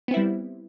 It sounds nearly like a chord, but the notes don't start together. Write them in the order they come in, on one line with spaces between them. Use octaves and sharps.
B3 C4 E4 G3